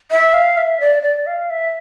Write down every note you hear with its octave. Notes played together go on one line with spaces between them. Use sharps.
E5
F5
E5
D5
D5
F5
E5